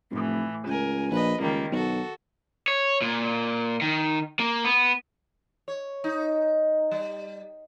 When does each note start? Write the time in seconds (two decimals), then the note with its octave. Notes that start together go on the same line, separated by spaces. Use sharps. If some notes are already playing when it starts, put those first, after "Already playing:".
0.11 F1 A2 E3
0.66 C#2 A#4 G#5
1.11 A#1 B4 D#5
1.40 C#2 D#3 G3 A#3
1.72 B1 F#4 A4
2.68 C#5
3.01 A#2
3.81 D#3
4.39 A#3
4.64 B3
5.68 C#5
6.04 D#4
6.91 G3